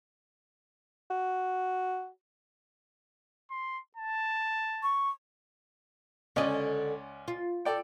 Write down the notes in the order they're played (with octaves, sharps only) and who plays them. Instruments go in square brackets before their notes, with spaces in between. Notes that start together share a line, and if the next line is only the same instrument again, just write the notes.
[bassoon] F#4
[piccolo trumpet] C6
A5
[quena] C#6
[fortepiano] C#2 C#4 D5 [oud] D3 D#5
[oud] F4
[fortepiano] A4 D5 G5